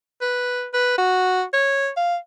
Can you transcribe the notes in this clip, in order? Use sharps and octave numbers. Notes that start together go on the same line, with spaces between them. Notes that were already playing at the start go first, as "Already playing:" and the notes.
B4
B4
F#4
C#5
F5